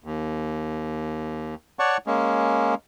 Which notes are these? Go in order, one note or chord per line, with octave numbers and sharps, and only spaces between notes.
D#2
C#5 D5 F#5 A5 C#6
G#3 A#3 C#4